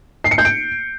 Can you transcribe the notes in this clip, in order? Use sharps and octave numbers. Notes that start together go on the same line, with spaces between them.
C7
C#7
G6
D7